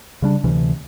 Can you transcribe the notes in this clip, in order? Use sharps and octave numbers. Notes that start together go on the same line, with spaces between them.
C#3 G3 D4
D2 C3 E3